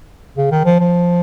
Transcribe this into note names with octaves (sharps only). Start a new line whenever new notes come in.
C#3
D#3
F3
F3